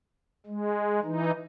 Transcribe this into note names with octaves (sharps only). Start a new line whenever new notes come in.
G#3
E3 D#4